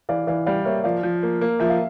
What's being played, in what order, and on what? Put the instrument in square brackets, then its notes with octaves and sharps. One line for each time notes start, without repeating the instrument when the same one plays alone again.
[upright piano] E3 [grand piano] D5 F5
[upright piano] E3 [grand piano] D5 F5
[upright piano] G3 [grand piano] D5 F5
[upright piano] A#3 [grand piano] C#5 E5
[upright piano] F3 [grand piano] D5 F5
[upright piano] F3
A#3
A#3
[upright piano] F3 [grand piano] E5
[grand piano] F5